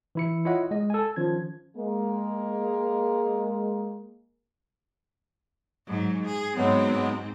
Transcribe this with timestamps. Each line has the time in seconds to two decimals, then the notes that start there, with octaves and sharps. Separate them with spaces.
0.15 E3 E4 C#7
0.45 E4 F4 C#5 D#5 F#5
0.71 G#3 D#5
0.90 A4 G#5
1.16 D#3 F3 C#4 G#6
1.77 G#3 A#3
5.87 G#2 F#3
6.25 G#4
6.56 G#2 F#3 G#3 B3 C4